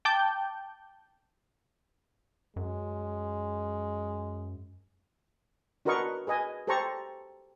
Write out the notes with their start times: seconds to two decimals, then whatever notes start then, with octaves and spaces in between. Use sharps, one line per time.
0.05 G5 A5 D6 G6
2.56 F#2 G#3
5.85 D4 F#4 A#4 B4 D#5 C#6
6.27 G#4 B4 D#5 G#5
6.67 G4 A4 C5 A5 A#5 C#6